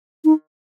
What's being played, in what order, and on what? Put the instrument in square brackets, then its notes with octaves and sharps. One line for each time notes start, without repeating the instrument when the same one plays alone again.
[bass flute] D#4